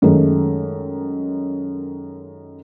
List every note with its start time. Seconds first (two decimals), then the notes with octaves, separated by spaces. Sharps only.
0.02 F#2 D#3 G#3 A3